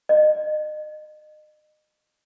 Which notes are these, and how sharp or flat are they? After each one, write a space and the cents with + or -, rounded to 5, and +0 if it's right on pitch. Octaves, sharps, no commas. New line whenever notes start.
D#5 -30